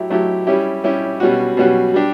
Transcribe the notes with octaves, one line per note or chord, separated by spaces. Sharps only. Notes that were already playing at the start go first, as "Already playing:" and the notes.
Already playing: F#3 A3 E4 G4
F#3 A3 E4 G4
G3 C#4 E4 G4
G3 C#4 E4 G4
B2 G3 C#4 F#4
B2 G3 C#4 F#4
G3 D4 G4